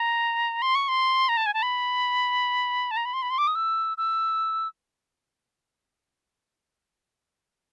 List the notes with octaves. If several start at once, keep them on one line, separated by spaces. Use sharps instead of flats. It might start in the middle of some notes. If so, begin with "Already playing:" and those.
Already playing: A#5
C6
C#6
C6
A#5
A5
G#5
A5
B5
A5
A#5
B5
C6
B5
C6
D6
D#6
E6
E6